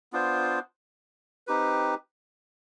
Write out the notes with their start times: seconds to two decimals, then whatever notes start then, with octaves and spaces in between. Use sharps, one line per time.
0.12 B3 D4 F4 C5
1.47 C4 D#4 G4 B4